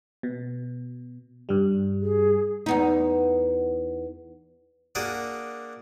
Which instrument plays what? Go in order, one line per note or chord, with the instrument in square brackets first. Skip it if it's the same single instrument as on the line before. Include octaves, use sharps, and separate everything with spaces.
[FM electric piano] B2
G2 G3
[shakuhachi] G#4
[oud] E2 B3 D#4
[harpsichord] A#3 D4 F#4 G#4 D5